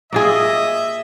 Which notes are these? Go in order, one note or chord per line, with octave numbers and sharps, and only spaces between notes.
A#3 F4 G#4 D#5 E5